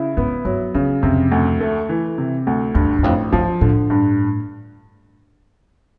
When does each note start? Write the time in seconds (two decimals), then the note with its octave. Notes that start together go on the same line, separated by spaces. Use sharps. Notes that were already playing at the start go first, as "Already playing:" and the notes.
Already playing: C#3 E4
0.17 G#2 B3
0.45 G2 F#3
0.74 F2 C#3
1.03 F2 C3
1.32 D2
1.60 A3
1.89 E3
2.18 C3
2.47 D2
2.75 E2 G2
2.98 E2
3.03 A1 F2
3.32 G2 F3
3.61 A2 D3
3.90 G2